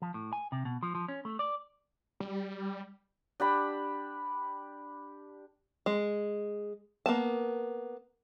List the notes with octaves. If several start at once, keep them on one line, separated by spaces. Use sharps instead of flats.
F3
A2
G#5
C3
B2
F3
F3
C#4
A3
D5
G3
D4 G4 B5
G#3
A#3 B3 A5